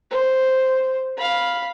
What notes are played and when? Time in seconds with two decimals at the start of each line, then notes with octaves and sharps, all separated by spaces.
0.11 C5
1.17 F5 B5